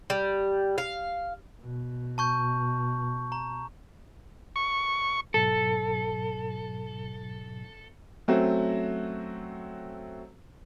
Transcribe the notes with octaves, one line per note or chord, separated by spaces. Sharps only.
G3
F5
B2
A5 C#6 G6
A#5
C#6
G#2 B2 F#3 A4
F#3 A3 C4 C#4 F#4